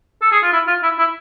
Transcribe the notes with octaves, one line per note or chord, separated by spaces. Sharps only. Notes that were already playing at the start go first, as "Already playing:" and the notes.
A4
G#4
F4
E4
F4
E4
E4